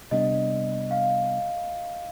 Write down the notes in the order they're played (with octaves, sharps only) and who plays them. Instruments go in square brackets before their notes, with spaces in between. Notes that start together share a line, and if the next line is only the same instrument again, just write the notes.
[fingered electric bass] C3 G3 B3 D4 [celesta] D#5
[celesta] F5